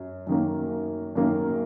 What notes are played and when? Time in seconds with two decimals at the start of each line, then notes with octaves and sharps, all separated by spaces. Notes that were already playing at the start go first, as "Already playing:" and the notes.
Already playing: F#2
0.27 F#2 D#3 A#3
1.15 F#2 D#3 A#3